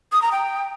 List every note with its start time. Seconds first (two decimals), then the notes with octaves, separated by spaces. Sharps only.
0.12 D#6
0.22 A#5
0.32 G5